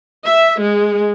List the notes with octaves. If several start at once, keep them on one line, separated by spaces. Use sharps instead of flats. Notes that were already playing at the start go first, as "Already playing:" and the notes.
E5
G#3